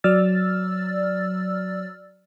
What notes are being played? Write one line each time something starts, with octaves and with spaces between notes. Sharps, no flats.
F#3 D5 E6 F6 A6